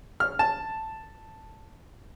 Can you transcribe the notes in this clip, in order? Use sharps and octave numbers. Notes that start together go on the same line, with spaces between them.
F6
A5